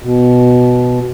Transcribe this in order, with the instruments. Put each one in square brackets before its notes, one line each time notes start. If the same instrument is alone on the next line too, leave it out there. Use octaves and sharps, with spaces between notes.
[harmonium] B2